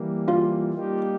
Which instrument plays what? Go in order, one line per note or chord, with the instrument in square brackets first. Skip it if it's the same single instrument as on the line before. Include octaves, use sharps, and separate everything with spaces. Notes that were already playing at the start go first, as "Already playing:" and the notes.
Already playing: [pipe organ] E3 G3 A#3
[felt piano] F4
[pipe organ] G3 A#3 D#4 G4